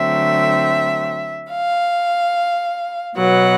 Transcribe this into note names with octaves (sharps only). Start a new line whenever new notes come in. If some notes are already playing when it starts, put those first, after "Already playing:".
Already playing: D3 F#3 A3 C4 E5
F5
B2 F#3 B3 F#5